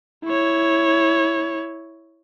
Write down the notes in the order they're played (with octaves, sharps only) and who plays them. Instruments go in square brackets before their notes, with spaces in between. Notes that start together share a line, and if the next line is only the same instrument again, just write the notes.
[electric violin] E4 C#5